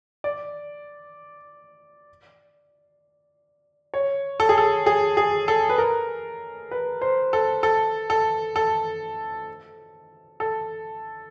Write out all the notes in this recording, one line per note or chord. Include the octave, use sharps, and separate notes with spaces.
D5
C#5
A4
G#4
A4
G#4
G#4
A4
B4
A#4
B4
C5
A4
A4
A4
A4
A4